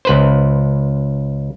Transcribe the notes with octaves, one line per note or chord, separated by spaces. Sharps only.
C#2 B4 C5